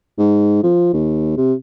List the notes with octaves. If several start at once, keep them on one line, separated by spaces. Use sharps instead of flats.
G#2
F3
D#2
C3